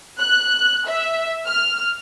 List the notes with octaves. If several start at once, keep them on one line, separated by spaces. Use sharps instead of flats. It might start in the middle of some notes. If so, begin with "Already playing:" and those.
F#6
E5
F6